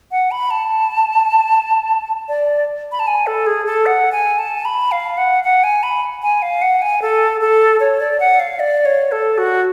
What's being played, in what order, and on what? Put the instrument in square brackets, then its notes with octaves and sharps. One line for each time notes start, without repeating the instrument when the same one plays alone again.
[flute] F#5
B5
A5
D5
B5
A5
G#5
A4
G#4
A4
F#5
G#5
A5
B5
F5
F#5
F#5
G#5
B5
G#5
F5
F#5
G#5
A4
A4
C#5
D5
F#5
F5
D5
C#5
A4
F#4